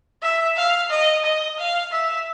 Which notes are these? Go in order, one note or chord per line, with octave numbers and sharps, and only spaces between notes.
E5
F5
D#5
D#5
F5
E5